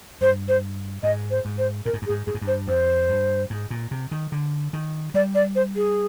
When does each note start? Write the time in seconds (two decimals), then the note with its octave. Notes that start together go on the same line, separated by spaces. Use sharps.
0.21 G2 C5
0.48 C5
1.03 G#2 D#5
1.31 C5
1.45 G#2
1.58 C5
1.85 A#2 A#4
1.93 G#2
2.02 G2
2.06 G#4
2.09 G#2
2.26 G2 G#4
2.34 G#2
2.42 G2
2.47 C5
2.68 F2 C5
3.09 G2
3.50 G#2
3.70 A#2
3.91 C3
4.11 D#3
4.32 D3
4.73 D#3
5.14 G3 D5
5.35 D5
5.55 C5
5.76 G#4